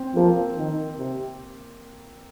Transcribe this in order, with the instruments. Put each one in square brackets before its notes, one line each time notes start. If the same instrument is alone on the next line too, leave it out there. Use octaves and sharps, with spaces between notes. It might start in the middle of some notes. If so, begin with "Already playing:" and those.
Already playing: [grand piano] C4
[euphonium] F3 [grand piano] A#3
[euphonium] D#3
C3